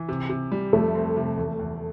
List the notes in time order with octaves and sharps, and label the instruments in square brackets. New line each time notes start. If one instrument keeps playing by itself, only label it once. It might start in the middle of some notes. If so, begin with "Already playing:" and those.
Already playing: [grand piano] E3
C3
C3
G3
[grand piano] F2 [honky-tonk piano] A3
[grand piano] C4
C3
E2
E2